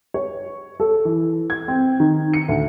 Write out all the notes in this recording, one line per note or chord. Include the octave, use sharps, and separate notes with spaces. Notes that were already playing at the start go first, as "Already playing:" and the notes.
C#5
A4
E3
G#6
C4
D#3
C#7
D2